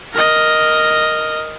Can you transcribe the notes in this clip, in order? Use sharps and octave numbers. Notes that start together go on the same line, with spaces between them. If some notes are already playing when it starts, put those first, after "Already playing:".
A#4 D#5